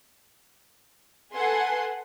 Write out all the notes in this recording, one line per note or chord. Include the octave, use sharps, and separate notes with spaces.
A4 B4 F#5 G#5 C6